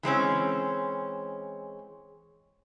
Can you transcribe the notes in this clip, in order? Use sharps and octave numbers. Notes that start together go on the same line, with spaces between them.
E3 G#3 C4 C#4